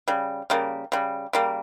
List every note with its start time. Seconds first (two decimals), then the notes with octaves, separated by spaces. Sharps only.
0.08 C#3 G3
0.50 C#3 G3 A#3
0.92 C#3 G3
1.33 C#3 G3 A#3